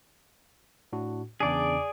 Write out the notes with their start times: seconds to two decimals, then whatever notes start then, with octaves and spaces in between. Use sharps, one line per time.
0.93 A2 D4 F#4
1.40 E2 C#3 D4 G#4 D5